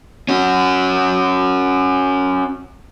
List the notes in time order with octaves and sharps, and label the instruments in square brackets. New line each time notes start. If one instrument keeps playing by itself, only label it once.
[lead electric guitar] C#4 F#4